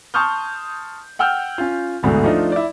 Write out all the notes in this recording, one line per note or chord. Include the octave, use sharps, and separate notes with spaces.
A5 C6 C#6 D#6 F6 G6
F#5 G5 E6 F6 G6
C#4 F4
G1 D2 G#2 B2 D3 E3
F3 A3 D4 D#4 F4
E4 D5